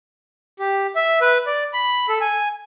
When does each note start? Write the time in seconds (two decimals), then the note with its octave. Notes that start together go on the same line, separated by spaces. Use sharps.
0.59 G4
0.96 E5
1.21 B4
1.46 D5
1.73 B5
2.09 A4
2.21 G#5